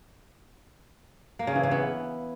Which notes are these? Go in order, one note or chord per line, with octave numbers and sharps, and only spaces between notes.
A#3
C#3
E3
C#3
B3